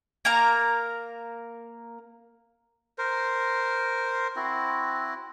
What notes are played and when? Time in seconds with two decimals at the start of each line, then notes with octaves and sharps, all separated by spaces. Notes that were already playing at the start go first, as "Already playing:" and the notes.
0.25 A#3 A#4 A#5
2.98 A#4 C5
4.36 C4 E4 F#4